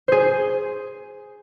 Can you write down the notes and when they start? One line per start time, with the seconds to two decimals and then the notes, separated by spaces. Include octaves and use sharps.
0.08 G#4 C5